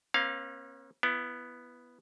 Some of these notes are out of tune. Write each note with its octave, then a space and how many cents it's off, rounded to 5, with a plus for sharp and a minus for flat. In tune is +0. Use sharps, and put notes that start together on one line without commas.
A#3 +45 C#4 -45 F5 +5
B3 +0 E4 +30